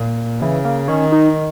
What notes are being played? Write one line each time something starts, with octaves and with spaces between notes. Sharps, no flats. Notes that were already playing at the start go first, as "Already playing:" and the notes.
Already playing: A#2
C#3 E3
A#3
D#3 C#4
D#4